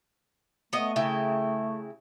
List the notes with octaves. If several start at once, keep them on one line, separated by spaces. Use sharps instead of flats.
A3 B3 D#5
C#3 E4 G5